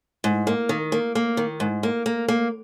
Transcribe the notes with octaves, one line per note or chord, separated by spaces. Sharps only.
G#2
A#3
D#3
A#3
A#3
D#3
G#2
A#3
A#3
A#3